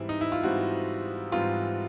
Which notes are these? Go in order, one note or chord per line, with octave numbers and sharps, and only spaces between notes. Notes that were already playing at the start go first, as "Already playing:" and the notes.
Already playing: G#2 E3 G3 C4 E4
D#4
E4
F4
G#2 E3 G3 C4 F#4
G#2 E3 G3 C4 F4